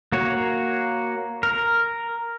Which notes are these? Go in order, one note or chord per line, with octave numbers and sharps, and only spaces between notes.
A#3 F#4 C#5
A#4